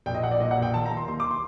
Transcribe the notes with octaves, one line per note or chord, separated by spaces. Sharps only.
A#1 G5
D#5
A#1 F#5
D5
A#2 D#5
F#5
A#1
G5
D#2 A5
A#5
D#2
C6
D#2 C6
D6
C6